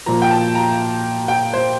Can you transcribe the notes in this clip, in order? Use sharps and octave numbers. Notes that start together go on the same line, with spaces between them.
A#2 F3 A#5
G5
A5
A#5
G5
C5